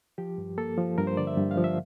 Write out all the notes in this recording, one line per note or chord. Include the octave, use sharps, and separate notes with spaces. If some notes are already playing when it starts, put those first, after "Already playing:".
F3 G4
G2
A#3 A4
F3
G2 A#4
C5
D3 D5
E5
G2
F5
F3
E5